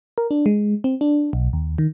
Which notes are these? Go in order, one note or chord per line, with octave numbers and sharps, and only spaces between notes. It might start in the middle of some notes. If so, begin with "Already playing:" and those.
A#4
D4
G#3
C4
D4
B1
D#2
D#3